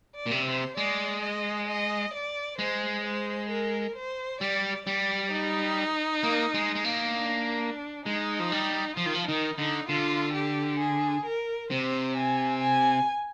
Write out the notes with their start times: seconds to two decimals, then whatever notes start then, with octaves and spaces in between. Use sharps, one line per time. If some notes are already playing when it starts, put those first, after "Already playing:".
0.16 D5
0.26 A#2
0.31 C3
0.46 C5
0.77 G#3 D5
1.22 D#5
1.68 D#5
2.14 D5
2.59 G#3 C5
3.05 C5
3.50 A#4
3.96 C5
4.41 G3 D5
4.87 G3 D5
5.32 D#4
6.23 A#3
6.54 G#3
6.75 G#3
6.84 A#3
7.14 D4
8.06 G#3 D#4
8.40 F3
8.52 G3
8.97 F3 F4
9.06 D#3
9.15 F3
9.27 D#3 D#4
9.58 D3 D#4
9.89 D3 F4
10.34 G4
10.80 G#4
11.25 A#4
11.71 C3 C5
12.17 G#5
12.62 G#5